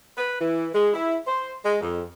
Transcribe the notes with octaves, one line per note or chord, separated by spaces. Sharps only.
B4
E3
G#3
E4
C5
G#3
F2